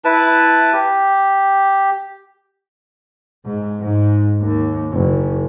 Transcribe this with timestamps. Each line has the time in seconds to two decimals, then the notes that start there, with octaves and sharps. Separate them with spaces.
0.05 E4 B4 A5
0.73 G4
3.45 G#2
3.81 G#2
4.41 D#2
4.91 F#1